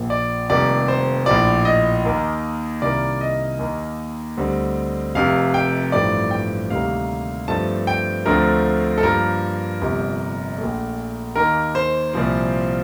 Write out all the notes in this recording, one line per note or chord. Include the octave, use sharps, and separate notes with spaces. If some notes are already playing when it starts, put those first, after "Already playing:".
Already playing: A#1 A#2 F3
D5
F1 F2 D#3 G3 A#3 D5
C5
A#1 A2 F3 D5
D#5
D#2 D#3 A#3
C2 C3 D#3 A#3 D5
D#5
D#2 D#3 A#3
D2 D3 G3 C4
F1 F2 C3 F5
G5
A1 G2 F3 A3 C4 D5
G5
D2 C3 D#3 G3 A#3 F5
G2 F3 A3 C4 A5
G5
D2 D3 F3 A3 C4 A#4
A4
G2 F3 A#3 A#4
G1 F2 C3 G3 A#3
A#1 A#2 A3
D#2 D#3 A#3 A#4
C5
C2 A#2 F3 C4